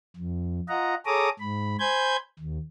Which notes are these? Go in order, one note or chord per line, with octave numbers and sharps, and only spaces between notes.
F2
F4 D#5 F#5 A#5
G#4 A4 C#5 A#5 D6 D#6
G#2 B5
C5 G#5 B5 G6 G#6
D#2